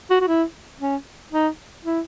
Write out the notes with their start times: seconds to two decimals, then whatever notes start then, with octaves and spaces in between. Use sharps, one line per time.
0.11 F#4
0.21 F#4
0.28 E4
0.81 C#4
1.33 D#4
1.85 E4